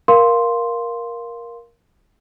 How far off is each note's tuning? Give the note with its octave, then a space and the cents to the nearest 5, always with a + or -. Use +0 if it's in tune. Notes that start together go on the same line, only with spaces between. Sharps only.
A#4 +10 F5 +0 C6 +0